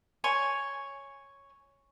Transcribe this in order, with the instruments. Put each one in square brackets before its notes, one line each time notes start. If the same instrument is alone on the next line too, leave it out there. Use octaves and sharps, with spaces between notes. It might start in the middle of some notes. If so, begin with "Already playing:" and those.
[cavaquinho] C#5 G#5 C6